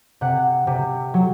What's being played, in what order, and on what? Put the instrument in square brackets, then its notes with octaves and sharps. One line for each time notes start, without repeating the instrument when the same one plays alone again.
[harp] C3 F#5
C3
F#3